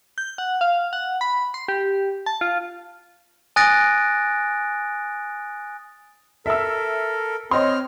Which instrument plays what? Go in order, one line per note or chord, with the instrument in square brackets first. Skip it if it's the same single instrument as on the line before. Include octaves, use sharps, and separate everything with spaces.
[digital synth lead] G6
F#5
F5
F#5
B5
C6
G4
A5
F4
[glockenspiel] G#5 D#6 F#6 A6 A#6 D7
[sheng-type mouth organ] A4 A#4 [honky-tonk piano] E5 E6
[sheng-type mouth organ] C4 F6 [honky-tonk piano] C#5 D#5 C6